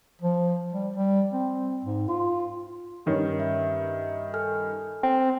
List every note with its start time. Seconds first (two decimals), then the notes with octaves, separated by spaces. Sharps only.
0.22 F3
0.73 G3
0.96 G3
1.33 C4
1.85 G#2
2.08 F4
3.06 G2 D#3 C#4
3.40 E5
4.34 A4 G#5 F6
5.03 C4